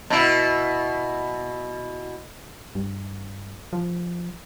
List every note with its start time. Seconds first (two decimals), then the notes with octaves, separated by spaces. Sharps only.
0.10 B2 E4
2.75 G2
3.73 F3